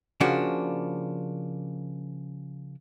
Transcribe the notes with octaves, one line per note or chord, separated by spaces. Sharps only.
C#3 F3 A#3 D4 F#4